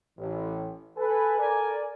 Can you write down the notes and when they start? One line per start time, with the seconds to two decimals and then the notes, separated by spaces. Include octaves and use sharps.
0.18 A1
0.97 A4 B4 G#5
1.38 A4 A#4 D5 G#5